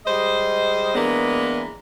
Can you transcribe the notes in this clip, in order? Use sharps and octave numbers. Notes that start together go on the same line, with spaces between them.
G3 G#3 C5 D#5
E3 G#3 A#3 B3 D4